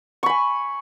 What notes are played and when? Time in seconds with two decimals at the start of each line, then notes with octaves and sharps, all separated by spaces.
0.23 C#6
0.26 B5
0.29 G#5